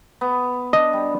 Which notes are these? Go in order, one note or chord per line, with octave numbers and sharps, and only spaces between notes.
B3
D4 D#5
G3